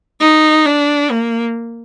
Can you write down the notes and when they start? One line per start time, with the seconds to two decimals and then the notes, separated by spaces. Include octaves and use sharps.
0.21 D#4
0.66 D4
1.11 A#3